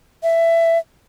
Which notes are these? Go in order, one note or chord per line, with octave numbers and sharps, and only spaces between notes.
E5